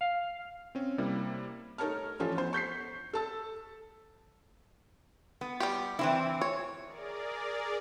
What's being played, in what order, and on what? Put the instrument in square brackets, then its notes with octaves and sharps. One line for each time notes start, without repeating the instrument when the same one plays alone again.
[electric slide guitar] F5
[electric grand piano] C4 C#4
C3 G3 A#3 E4
[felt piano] A3 D#4 A#4 C#5 A5 F6
E3 F3 A3 C#4 F4
B3 C5
C#6 G6 B6 C7
A4 A5 E6
[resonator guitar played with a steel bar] B3
[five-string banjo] G3 G4
[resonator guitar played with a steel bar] E3 C4 E4
[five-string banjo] C#5
[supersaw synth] G#4 A#4 D5